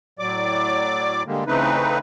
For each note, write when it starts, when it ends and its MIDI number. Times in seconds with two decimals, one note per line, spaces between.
0.19 1.23 45
0.19 1.23 54
0.19 1.23 74
0.19 1.23 86
1.26 1.44 50
1.26 1.44 55
1.26 1.44 56
1.26 1.44 58
1.47 1.98 49
1.47 1.98 52
1.47 1.98 57
1.47 1.98 60
1.47 1.98 63
1.47 1.98 71